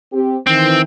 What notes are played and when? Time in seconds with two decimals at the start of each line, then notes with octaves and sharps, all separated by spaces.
0.13 C4 G4
0.47 D#3 E3 C4